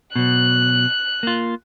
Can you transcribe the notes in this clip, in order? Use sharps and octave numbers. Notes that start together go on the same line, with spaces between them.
B2 F#3 F#6
A#3 F4